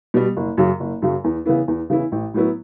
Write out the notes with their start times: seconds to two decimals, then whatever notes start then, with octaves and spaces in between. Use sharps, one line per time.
0.14 B2 G3
0.37 F#1
0.58 F#2 C#3 F#3
0.80 F#1
1.02 F#2 C#3 F#3
1.24 E2
1.46 C#3 E3 B3 E4
1.68 E2
1.90 C#3 E3 B3 E4
2.12 A1
2.34 A2 F#3 B3 E4